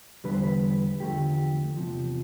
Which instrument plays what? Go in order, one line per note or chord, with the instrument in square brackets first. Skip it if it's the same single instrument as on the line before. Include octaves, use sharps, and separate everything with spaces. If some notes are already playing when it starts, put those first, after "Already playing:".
[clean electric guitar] E2 D3 G3 B4
C5
B4
E2 D3 F3 A3 G4
E2 C3 F3